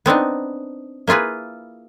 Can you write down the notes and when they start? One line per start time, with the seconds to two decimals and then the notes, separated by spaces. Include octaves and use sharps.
0.06 B3 C4 D4 D#4
1.07 A#3 E4 F4 G#4 B4